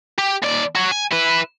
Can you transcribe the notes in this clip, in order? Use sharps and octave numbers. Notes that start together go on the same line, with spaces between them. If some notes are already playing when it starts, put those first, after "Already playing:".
G4
D#2 D5
F#4 C#5
G#5
E4 B4